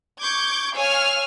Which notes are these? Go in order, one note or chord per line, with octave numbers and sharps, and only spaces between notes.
C#6 D6 G6 G#6
C#5 F5 G#5 E6 F6